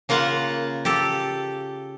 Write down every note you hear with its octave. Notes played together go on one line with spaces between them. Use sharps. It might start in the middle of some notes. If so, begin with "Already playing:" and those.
C#3 A#3 F4 F#5
G4 A4